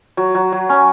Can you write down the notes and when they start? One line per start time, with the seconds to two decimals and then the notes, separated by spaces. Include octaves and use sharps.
0.17 F#3
0.35 F#3
0.52 F#3
0.69 C#4